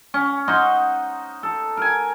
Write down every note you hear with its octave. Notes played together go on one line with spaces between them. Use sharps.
C#4
D#4 C5 D#5 F#5
A4
A#4 G#5